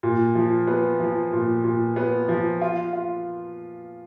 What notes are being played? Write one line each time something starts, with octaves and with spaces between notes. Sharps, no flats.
A#2
F3
B3
F3
A#2
A#2
B3
F3
F4
F4